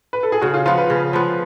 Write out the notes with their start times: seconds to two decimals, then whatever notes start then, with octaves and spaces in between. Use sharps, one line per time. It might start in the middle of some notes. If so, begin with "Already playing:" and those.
0.13 B4
0.23 A4
0.32 G#4
0.41 C#3 F#4
0.54 F4
0.66 F3 B3 F4
0.78 B4
0.90 C#3
1.13 F3 B3